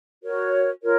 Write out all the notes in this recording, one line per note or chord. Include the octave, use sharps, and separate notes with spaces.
F#4 A#4 C#5
F4 A#4 C#5